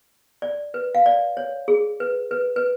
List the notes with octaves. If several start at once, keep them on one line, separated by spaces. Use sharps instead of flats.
D5
B4
F5
D5
C#5
G#4
B4
B4
B4